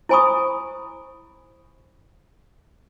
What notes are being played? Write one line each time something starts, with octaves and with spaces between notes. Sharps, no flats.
E4 C5 G#5 B5 C#6 D#6